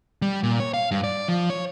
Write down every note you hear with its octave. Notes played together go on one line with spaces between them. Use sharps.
G3
A#2
C#5
F5
G2
D5
F3
C#5